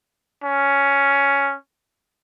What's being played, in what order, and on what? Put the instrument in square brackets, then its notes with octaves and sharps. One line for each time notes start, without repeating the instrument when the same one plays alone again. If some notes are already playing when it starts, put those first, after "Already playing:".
[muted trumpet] C#4